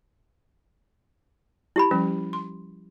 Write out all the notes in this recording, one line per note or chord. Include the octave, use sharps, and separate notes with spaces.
E4 G4 B5
F3 G3 C#4
C6